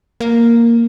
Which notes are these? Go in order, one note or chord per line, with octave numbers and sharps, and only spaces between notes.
A#3